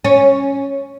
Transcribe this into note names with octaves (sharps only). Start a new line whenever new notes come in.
C#4